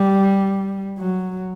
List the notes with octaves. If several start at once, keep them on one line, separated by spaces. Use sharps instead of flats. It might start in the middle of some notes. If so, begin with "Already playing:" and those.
Already playing: G3
F#3